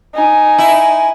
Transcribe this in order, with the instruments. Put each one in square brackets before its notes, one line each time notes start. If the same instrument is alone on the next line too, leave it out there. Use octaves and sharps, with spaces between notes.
[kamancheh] D#4 G#5
[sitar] E4